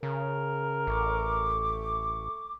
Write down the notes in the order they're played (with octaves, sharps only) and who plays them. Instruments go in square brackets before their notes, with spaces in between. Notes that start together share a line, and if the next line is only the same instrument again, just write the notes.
[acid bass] C#3 [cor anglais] A#4
[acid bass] A1 [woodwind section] A3 C#6 D6